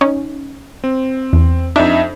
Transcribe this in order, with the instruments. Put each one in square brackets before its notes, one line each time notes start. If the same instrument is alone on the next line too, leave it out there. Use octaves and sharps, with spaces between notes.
[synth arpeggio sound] C#4 D#4
[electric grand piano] C4
[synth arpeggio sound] E2
[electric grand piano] F2 D#4 E5 [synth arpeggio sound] D4